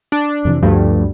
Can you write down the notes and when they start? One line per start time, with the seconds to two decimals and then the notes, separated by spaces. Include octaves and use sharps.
0.12 D4
0.45 F2 C3 E3
0.62 D2 G2 F3 A3